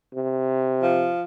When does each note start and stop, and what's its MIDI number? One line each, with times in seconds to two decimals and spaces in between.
0.14 1.11 48
0.82 1.24 53